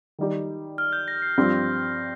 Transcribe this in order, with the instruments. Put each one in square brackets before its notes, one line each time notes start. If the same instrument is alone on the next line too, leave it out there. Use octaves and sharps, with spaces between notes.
[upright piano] D#3 G3 D#4 G4
[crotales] F6
G6
A#6
C7
[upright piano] G2 F3 C4 G4